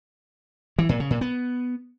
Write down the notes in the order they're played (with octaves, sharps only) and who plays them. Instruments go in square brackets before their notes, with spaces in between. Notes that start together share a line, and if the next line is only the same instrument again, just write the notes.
[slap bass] E3
A#2
C#3
A#2
B3